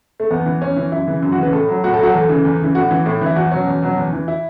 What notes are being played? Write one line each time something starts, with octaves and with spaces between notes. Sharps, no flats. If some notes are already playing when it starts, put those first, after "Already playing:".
A3
E2 B3
E3
E2 C#4
E3
F#2 E4
C#3 E3
F#2
F#4
C#3 E3 B4
A2 A4
F#3
A2 F#4
A4
F#3 F#4
E2 A4
C#3 E3
E2
C#3 E3
A2 F#4
E3
A2
E3 E4
E2 F#4
B2 F#3 C#4
E2
B2 F#3
E2
E3
E4